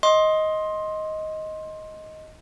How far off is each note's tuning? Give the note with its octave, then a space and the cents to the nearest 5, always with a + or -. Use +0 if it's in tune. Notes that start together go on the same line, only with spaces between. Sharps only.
D#5 +10 C6 +15